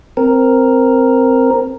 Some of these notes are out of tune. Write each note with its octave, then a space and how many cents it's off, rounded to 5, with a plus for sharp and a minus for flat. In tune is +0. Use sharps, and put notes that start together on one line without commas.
C4 +0 A#4 +0